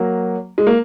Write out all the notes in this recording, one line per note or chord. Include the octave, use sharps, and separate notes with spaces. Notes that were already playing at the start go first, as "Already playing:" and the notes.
Already playing: F#3 A#3
G#3
A#3